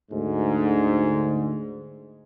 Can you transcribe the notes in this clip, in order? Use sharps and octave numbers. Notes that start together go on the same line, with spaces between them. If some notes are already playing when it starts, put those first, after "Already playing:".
D2 G#2